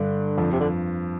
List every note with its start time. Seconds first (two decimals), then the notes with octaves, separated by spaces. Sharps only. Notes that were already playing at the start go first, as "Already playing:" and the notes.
Already playing: G2 D3
0.38 F2
0.52 C3
0.60 D3